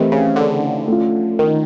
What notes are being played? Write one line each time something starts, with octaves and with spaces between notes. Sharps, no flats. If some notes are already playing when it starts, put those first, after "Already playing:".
Already playing: D#3 E3 A3 C4 E4 G4
C#3
D3
A3 C#4 F4
D#3